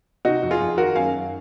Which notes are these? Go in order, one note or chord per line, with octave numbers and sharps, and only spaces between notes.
C3 D#4 F#4
F2
F4 G#4
F2
D#3 F#4 A#4
F#2 F5 G#5
F#2